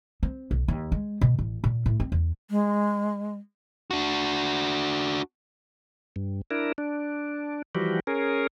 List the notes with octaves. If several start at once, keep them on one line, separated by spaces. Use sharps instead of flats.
C4
B1
D#2
G#3
B2
A1
A#2
A2
C4
E2
G#3
D4 F#4
G2
D4 E4 A#4
D4
E3 F3 G3 F#4 G4
C#4 G#4 A#4